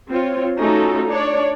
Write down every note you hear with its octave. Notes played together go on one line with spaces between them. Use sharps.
C4 F4 C#5
A3 C#4 D#4 F4 F#4 A4
D4 C#5 D5